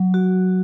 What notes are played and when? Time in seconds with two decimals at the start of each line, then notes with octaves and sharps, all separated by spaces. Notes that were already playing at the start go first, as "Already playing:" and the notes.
Already playing: F#3
0.14 F#4